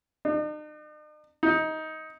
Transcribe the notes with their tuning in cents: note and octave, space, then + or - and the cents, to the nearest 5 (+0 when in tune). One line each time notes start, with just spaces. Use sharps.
D#4 -45
D#4 +15